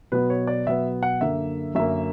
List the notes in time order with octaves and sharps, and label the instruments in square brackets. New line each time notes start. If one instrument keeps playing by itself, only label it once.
[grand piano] B2 F#3 B3 B4
C#5
D5
B2 F#3 B3 E5
F#5
F#2 D3 A#3 E5
F#2 D3 A#3 E5